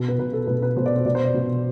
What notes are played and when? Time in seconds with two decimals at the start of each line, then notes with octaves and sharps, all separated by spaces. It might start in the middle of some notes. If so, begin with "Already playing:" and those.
Already playing: B2
0.08 B4
0.19 B2 B4
0.33 A4
0.47 B2 B4
0.62 B4
0.77 B2 C5
0.86 D5
0.96 C5
1.05 B2 D5
1.15 C5
1.25 D5
1.34 B2